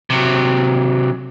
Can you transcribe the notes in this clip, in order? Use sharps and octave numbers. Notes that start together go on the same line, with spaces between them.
C3 F#3